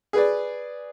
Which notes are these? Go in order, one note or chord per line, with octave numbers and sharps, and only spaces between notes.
G#4 B4 D5